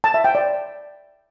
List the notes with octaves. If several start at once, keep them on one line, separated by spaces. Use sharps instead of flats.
A5
E5
G5
D5